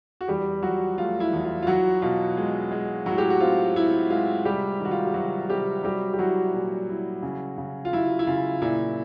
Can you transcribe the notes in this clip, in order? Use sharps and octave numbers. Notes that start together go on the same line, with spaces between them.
F#4
E2 G3 G4
F3 F#3 F#4
A3 F4
E4
E2
F4
F4
F#3 E4 F#4
B2 F4
G#3
G#3
A2 F#3 F#4
G4
F#4
C4 F4
A2 E4
G#3 F4
C3 G3 G4
D#3
F#4
F4
G4
C3 F#3 F#4
C3 G3 G4
F#3 G3 G4
G4
F#3 E4 F#4
A#2
E4
C#3
C#3
F4
F#3 E4
E4
C#3 F4
A#2 E4